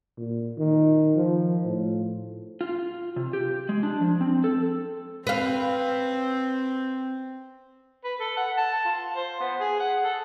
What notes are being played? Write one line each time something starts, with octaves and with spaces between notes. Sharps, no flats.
A#2
D#3
F3
A2
F4
C3
G4
G#3
D4
F3
C4
A4
C4 B4 F5
B4
A4
F#5
A5
F4
C5
B3
G#4
F#5
A4